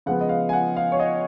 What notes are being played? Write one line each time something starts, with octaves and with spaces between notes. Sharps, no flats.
C#3 F3 G#3 B3 F#5
D#5
F5
G#5
F#5
F5
C#5
D#5